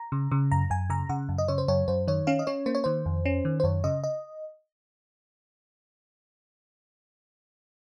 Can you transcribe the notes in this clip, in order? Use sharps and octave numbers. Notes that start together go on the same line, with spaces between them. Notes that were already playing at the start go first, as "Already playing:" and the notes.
Already playing: A#5
C#3
C#3
F#2 A#5
F#2 G#5
C#3 A#5
C#3 F#5
F#2
D#5
C#3 C#5
C5
F#2 C#5
F#2 C5
D#3 C#5
C#4 F5
D#5
C#4 C#5
A#3 C5
C#5
D#3 C5
F2
C#4
D#3
C5
F#2 C#5
C#3 D#5
D#5